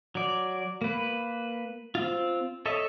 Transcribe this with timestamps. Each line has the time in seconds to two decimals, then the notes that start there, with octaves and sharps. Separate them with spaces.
0.15 F#3 D5
0.82 A#3 B4
1.95 C4 F4
2.66 A4 C#5 D#5 E5